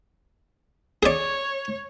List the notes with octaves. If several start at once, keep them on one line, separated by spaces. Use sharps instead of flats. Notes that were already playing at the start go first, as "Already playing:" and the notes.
G#4 C#5 D5